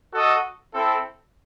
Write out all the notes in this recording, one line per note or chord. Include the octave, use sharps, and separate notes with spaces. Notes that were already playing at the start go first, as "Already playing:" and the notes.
F#4 A4 D#5
C4 E4 A4